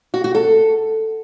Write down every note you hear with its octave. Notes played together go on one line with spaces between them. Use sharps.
F#4
F#4
A4